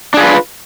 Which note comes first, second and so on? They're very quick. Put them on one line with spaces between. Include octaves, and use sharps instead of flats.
D4 G#4 F4 B4